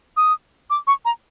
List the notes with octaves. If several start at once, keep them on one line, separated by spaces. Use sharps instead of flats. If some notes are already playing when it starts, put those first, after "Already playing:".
D#6
D6
C#6
A#5